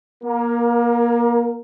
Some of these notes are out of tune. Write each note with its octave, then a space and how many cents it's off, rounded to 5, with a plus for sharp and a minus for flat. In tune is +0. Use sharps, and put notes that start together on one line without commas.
A#3 +30 A#4 +0